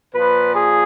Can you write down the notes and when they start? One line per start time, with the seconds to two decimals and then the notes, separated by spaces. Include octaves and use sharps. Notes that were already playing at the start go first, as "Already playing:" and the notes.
0.14 A#2 F3 B4
0.54 G#4